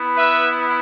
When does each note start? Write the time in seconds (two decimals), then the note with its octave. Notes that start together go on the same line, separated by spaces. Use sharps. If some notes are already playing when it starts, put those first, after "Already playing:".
Already playing: B3 E4
0.16 B4 E5